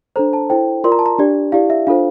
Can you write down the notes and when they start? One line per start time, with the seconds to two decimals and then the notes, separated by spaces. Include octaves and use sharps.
0.16 D4 A4 C5 A#5
0.33 A5
0.50 E4 A4 C5 G5
0.84 F4 A#4 D5 C6
0.92 A#5
0.99 A5
1.06 A#5
1.18 D4 G4 D5
1.52 E4 G4 D5 F5
1.70 E5
1.87 D4 F4 A4 C5 F5